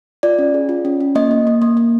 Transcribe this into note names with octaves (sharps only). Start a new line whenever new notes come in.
F4 D5
C#4
G#4
F4
C#4
C#4
A#3 D#5
A#3
A#3
A#3
A#3